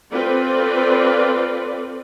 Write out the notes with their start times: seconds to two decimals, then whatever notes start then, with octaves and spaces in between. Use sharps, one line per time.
0.12 C4 F4 A4 B4 D5